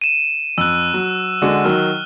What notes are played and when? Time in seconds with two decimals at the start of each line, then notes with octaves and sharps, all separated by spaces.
0.02 D#7 E7
0.58 F2 E6 F#6
0.94 F#3
1.42 D3 G#3 F#4
1.65 D#3 F#3 F6